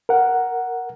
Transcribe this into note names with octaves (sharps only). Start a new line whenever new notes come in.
A#4 F#5